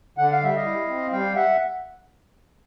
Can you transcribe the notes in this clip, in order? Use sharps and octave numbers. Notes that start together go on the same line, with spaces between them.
D3 F#5
F5
G3 E5
D#5 F5
E4
C4
G3 F5 G5
E5 F#5